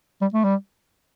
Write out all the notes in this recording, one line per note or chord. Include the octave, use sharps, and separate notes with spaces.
G3
A3
G3